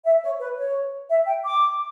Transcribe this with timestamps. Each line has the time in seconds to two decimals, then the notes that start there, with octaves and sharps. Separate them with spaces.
0.05 E5
0.23 C#5
0.40 B4
0.58 C#5
1.09 E5
1.26 G5
1.44 D6